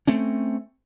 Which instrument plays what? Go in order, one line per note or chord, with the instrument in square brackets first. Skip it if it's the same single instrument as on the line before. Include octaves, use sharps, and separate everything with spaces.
[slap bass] A3 C4 C#4